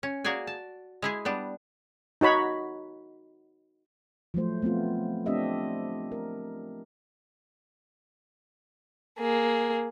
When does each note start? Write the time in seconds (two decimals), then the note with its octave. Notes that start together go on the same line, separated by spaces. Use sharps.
0.03 C#4
0.24 A#3 F#4 G#4 D5 G#5
0.47 A5
1.02 G#3 E4 G#4
1.25 G3 B3 D4
2.21 D#4 F#4 C#5 B5
4.34 F3 F#3 A3 C5
4.62 A3 B3 C4 F4
5.26 A3 C4 D4 G4 D#5 E5
6.12 A#4
9.19 A#3 G#4